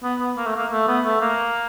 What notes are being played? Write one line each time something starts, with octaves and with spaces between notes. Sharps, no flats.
B3
B3
A#3
A3
A#3
A3
B3
A3
A#3